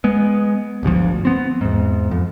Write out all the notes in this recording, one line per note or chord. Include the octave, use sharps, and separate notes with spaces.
G#3 B3
D1 G1 D2 F3
B3 C4
E2 G#2
F2